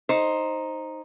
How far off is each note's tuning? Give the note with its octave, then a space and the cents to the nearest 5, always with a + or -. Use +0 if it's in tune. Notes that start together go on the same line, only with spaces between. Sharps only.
D#4 +0 C5 +10